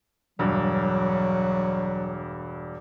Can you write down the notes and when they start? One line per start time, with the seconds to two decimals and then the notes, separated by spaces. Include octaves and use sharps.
0.39 E1 G2 F#3